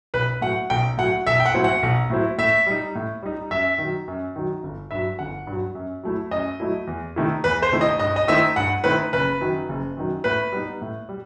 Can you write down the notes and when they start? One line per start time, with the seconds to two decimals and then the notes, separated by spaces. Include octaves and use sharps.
0.14 B1 B4
0.41 A2 F#3 F#5
0.70 B1 G5
0.97 A2 F#3 F#5
1.26 B1 E5
1.40 G5
1.45 F#5
1.54 A2 F#3 C4 E4
1.64 F#5
1.83 B1
2.10 A2 F#3 C4 E4
2.38 A2 E5
2.67 G3 D#4
2.95 A2
3.23 G3 D#4
3.51 F#2 E5
3.78 D#3
3.83 F#3
4.08 F#2
4.36 D#3 F#3
4.63 G1
4.91 G2 F#3 E5
5.19 G1 F#5
5.47 G2 F#3
5.75 F#2
6.03 F#3 A3 E4
6.31 F#2 D#5
6.60 F#3 A3 E4
6.87 E2
7.16 C3 D#3 A3 E4
7.44 E2 B4
7.62 C5
7.72 C3 D#3 A3 E4
7.81 D#5
7.99 G2 D#5
8.16 D#5
8.28 D#3 A3 C4 E4 E5
8.56 G2 F#5
8.84 D#3 A3 C4 E4 B4
9.13 F#1 B4
9.41 F#2 D#3 F#3
9.69 F#1
9.97 F#2 D#3 F#3
10.24 A2 B4
10.52 G3 B3 D#4
10.81 A2
11.09 G3